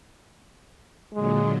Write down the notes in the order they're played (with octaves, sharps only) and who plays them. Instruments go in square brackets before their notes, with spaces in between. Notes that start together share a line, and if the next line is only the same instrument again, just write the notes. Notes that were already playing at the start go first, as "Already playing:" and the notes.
[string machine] A#2 D3 F#3 [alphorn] G#3